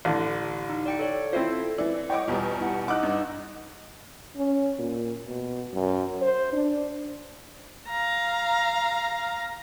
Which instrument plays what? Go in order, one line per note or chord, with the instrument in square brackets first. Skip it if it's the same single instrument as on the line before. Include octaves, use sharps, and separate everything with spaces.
[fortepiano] A1 D3
[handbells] D#4
D5 G5 C#7
A4 C#5 D5
[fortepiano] C4 E4 C5 [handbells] F4 A4
[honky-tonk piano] E3 [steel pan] E4 D5
[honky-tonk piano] C#5 D#5 D6 [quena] F#5 [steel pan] G5
[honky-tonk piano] E2 B2 G3 [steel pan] F4 [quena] A#5
[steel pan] E4 [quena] F#5
[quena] D#4 [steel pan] F#5 [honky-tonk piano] D6 E6 F#6
[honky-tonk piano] G2 D#5
[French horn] C#4
A#2
B2
F#2
C5
D4
[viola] F5 A#5